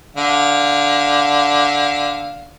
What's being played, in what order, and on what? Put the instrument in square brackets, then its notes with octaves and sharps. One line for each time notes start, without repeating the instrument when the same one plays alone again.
[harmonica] D3 F5